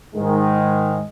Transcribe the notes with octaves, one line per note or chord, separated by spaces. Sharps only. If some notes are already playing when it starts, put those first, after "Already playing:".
G#2 D#3 G#3